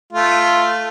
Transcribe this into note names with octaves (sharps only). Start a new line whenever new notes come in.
A3 F4